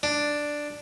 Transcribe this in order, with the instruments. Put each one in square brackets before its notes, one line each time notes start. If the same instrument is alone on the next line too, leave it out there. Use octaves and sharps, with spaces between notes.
[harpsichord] D4